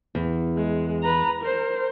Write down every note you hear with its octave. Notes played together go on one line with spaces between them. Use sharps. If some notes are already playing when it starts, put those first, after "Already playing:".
E2
G#3
B4 A#5
A#4 C5